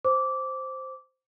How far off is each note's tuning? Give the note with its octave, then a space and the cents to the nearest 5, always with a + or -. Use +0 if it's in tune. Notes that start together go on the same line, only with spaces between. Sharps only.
C5 +0 D6 -15